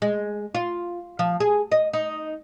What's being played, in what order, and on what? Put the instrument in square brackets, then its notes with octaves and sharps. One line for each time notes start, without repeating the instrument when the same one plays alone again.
[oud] G#3
F4
F3
G#4
D#5
D#4